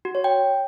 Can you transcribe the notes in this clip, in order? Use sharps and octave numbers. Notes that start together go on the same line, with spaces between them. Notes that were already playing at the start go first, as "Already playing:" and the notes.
F#4
C#5
G5